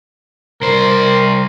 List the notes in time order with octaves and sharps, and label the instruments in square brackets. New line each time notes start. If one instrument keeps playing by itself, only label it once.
[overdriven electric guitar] C2 C5 [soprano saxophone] A#4